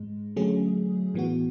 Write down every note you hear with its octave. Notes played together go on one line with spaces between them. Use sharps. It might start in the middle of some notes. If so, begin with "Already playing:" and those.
Already playing: G#2 G#3
D3 F#3 A3 C#4 G#4
A2 E3 B3 F#4